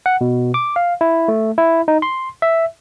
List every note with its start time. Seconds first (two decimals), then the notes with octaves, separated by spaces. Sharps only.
0.06 F#5
0.21 B2
0.54 D6
0.76 F5
1.01 E4
1.28 A3
1.58 E4
1.88 D#4
2.02 C6
2.42 E5